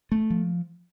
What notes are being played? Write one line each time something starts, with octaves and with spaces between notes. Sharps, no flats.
A3
F3